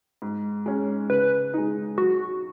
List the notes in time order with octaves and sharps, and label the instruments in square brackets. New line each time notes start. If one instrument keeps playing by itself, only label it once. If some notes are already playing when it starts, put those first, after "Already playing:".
[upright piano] G#2
G#3 C#4
[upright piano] C#3 [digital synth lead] B4
[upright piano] G#3 D#4
[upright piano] F#3 [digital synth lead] F#4